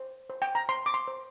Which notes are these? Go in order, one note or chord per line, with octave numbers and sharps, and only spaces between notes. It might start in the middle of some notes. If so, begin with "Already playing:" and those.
Already playing: C5
C5
G5
A#5
C5 C6
D6
C6
C5